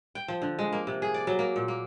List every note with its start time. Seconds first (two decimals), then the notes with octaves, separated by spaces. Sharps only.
0.15 G5
0.28 F3
0.42 D3
0.59 G#3
0.73 A#3
0.87 C3
1.02 G#4
1.14 D5
1.27 F#3
1.39 A#3
1.56 A#2
1.68 A#3